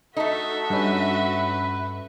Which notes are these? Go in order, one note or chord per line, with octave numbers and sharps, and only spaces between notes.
A3 D#4 F#4 A4 E5
G2 C#4 B4